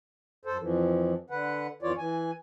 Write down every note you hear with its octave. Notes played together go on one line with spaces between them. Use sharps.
F#2 A4 C5
F2 E3 F3
D3 B4 F#5
F2 E3 F4 C#5 D5
E3 G#5